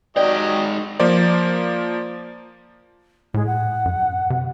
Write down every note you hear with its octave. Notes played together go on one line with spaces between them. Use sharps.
G#2 F#3 G4 D5 D#5 G5
F3 A#3 F4 C5 D5
A2 G#3
F#5
F#2
C3